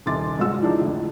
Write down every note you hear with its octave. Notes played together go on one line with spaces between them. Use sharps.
D#1 C3 D#3 C6 D6 A6
G1 G#2 G#3 F#4 E6
E3 F3 G#3 D4 D#4
F2 A2 D3